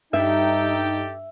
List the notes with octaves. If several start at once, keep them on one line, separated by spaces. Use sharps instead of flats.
G2 D#4 G4 A4 E5 G5